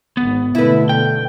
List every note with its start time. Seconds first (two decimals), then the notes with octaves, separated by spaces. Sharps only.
0.17 G#1 B3
0.55 B2 D3 A3 E4 B4
0.89 G2 G5